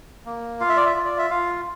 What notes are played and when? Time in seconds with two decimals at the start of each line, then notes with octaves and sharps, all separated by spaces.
0.26 A#3
0.60 F4 F5
0.69 E5
0.77 D5
0.86 E5
0.96 F4
1.05 D5
1.18 E5
1.30 F4 F5